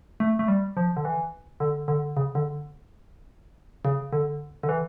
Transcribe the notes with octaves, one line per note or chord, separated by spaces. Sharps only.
A3
A3
G3
F3
D3
E3
D3
D3
C#3
D3
C#3
D3
D3
E3